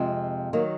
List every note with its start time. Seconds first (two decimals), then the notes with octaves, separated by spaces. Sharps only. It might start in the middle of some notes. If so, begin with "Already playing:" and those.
Already playing: F2 C3 F3 G#3
0.53 D#3 F#3 A#3